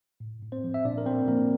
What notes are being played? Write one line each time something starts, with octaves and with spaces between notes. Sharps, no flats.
A2
A2
C4 C5
F3
E5
A#2 D4 D5
A#4
A#2 C4 C5
F3 A#3 A#4